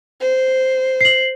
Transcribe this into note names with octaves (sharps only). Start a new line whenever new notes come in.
C5
C7 F#7